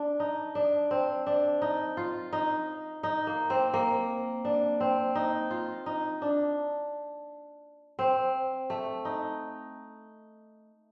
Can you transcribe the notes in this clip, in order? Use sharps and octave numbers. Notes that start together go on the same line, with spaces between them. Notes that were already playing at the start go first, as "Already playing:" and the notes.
Already playing: D4
D#4
D4
C4
D4
D#4
F4
D#4
D#4
A#3
C4
A#3
D4
C4
D#4
F4
D#4
D4
C4
A3
D#4